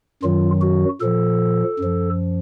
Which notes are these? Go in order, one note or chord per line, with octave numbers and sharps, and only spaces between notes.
F#2 D#3 F#3 F4
F#4
A#2 F3 A4
F#2 F3